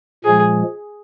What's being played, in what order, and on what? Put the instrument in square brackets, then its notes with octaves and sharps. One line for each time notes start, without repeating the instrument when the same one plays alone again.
[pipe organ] A#2 F3 G#3 [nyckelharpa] G#4